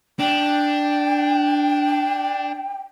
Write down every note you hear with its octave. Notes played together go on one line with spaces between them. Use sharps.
D4 G5